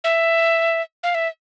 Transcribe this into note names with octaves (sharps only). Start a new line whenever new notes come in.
E5
F5
E5